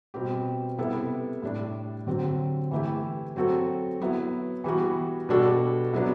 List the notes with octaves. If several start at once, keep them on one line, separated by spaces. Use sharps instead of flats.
B2 G3 C4 G4
C3 G3 B3 E4 A4
A2 G3 D4
D3 F#3 C4 G4
E3 A3 E4 G4
F#3 C4 F#4 A4
F#3 B3 E4
E3 G3 B3 F#4
B2 G3 D4 F#4 A4
C3 F#3 B3 D4